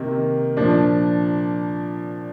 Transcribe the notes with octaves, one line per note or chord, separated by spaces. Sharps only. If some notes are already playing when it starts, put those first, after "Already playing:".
Already playing: C3 D#3 A#3
A#2 F3 D4